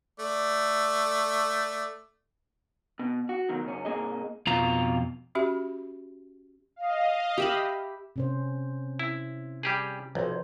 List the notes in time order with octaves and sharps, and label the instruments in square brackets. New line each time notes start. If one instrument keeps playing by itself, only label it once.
[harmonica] A3 D5
[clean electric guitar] B2
F#4
B2 D#3 F#3
C#2 F#2 C#4
C2 G#2 A#3 G#4 D#5
[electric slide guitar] F2 B2 F4 F5 A#5
[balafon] C#4 F#4 G4 E5 B5
[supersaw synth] D#5 F5
[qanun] G4 E5 B5
[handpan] C3 C#4 C5
[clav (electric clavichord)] E4
G3 G4 G#4
[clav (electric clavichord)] B1 [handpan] F3 B4 C5